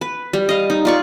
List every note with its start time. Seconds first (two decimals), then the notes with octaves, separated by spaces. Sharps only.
0.01 B4
0.33 G3
0.49 D#5 F5
0.70 D#4
0.85 F4 D5 C#6